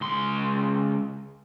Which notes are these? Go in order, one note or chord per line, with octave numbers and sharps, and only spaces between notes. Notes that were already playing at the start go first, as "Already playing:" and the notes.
C#2 C6